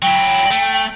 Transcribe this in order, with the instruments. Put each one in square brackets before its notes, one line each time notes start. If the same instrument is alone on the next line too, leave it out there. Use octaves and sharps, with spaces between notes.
[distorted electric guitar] F#3 E4 [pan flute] G5
[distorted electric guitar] A3